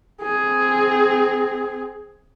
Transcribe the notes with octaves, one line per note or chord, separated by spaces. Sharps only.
C4 G#4